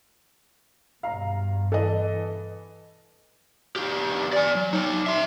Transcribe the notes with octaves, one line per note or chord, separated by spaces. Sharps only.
G2 B2 F5 A#5
E3 A4 D#5
E2 G4
D5 G#5
F#3
D#4 C#5
E5 C6